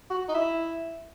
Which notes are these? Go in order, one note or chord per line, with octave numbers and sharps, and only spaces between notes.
F#4
D#4
E4